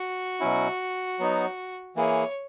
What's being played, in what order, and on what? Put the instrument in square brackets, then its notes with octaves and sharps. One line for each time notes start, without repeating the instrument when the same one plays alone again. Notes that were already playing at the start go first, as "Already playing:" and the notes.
Already playing: [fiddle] F#4
[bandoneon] B2 F#3 C#4 E4
F#3 B3 D#4
[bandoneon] E3 A#3 E4 G#4 [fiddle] C#5